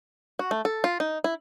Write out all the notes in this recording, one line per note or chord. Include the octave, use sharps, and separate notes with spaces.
F#4
A3
A4
F4
D#4
E4